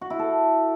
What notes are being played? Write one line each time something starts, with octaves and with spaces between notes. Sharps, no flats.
F#4
E4
A4